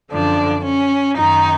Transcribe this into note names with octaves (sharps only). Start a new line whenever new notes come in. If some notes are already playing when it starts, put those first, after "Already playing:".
F#2 D3 F3 D4
C#4
F#2 D#3 D#4